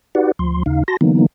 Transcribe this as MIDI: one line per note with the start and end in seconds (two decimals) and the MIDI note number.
0.15 0.32 63
0.15 0.32 66
0.15 0.32 67
0.15 0.32 71
0.15 0.32 74
0.15 0.32 78
0.39 0.63 38
0.39 0.63 53
0.39 0.63 84
0.66 0.83 39
0.66 0.83 49
0.66 0.83 63
0.66 0.83 77
0.88 0.97 66
0.88 0.97 81
0.88 0.97 84
0.88 0.97 94
1.01 1.26 50
1.01 1.26 52
1.01 1.26 54
1.01 1.26 58
1.01 1.26 59
1.01 1.26 63